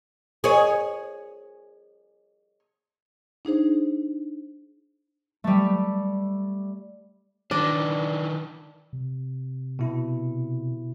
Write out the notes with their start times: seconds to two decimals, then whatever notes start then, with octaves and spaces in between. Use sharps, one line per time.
0.44 G#4 C#5
3.45 D4 D#4 G#4 C5
5.44 G3 A3
7.51 D#3 E3 D4 D5
8.93 C3
9.79 B2 E4